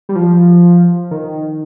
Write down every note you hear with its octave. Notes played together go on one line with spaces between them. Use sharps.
G3
F3
D#3